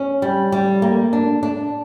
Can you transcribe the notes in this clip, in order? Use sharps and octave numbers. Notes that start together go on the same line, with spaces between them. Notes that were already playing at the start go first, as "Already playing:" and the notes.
Already playing: C#4
G3
G3
A#3
D4
D4